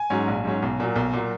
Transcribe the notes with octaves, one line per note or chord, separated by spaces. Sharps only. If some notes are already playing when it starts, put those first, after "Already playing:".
Already playing: G#5
G#2 F#3 C#4
A#1
G#2 F#3 C#4
B1
A#2 F#3
B1
A#2 F#3